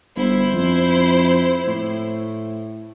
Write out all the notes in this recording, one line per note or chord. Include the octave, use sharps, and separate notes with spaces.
G1 E4 C5
F2
A2